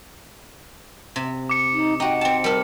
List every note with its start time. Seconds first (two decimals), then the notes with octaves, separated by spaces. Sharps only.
1.16 C3
1.49 D6 C#7
1.73 D#4
2.00 D#4 F#4 G5
2.21 C4 G5 A5
2.44 G3 A4 A#4